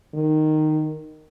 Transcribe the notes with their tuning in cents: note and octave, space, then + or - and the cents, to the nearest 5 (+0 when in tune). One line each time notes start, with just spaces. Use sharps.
D#3 -10